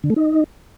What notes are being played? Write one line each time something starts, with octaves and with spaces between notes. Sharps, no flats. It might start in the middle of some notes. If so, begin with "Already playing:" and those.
D3
A3
D#4